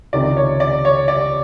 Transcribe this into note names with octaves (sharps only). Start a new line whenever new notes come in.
C#2 C3 D#3 D5
C#5
D5
C#5
D5